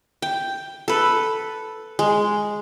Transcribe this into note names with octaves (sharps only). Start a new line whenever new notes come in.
G5
A4 B4
G#3